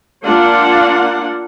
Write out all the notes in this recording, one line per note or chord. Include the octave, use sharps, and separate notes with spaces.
A#3 D4 F4 F#5